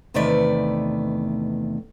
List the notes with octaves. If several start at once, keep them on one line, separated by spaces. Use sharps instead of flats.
E2 C3 D#3 A3 B4 D5